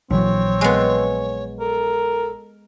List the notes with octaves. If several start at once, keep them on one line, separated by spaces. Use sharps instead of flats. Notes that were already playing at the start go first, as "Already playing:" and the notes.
A#1 E3 F#3 C4 C#5
G#3 B3
A4 A#4